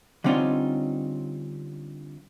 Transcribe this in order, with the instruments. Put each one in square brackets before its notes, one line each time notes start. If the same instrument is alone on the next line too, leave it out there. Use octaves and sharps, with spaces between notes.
[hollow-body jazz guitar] D3 G3 C4 C#4 D#4 F4